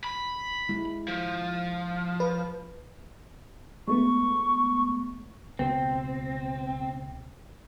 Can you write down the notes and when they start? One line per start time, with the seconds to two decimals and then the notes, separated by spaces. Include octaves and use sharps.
0.04 B5
0.69 G#3 E4
1.08 F3
2.20 B4
3.88 G#3 A3 B3 C#6
5.59 C#2 B2 C4